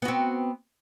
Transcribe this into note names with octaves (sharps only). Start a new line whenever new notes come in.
B3 C4 F#4